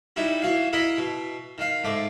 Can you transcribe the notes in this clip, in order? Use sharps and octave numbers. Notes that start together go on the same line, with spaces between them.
G3 D#4 E4 F#4
E3 F#4 F5
E4 A#4 D#5 B5
B2
D#3 F5
G#2 A3 D6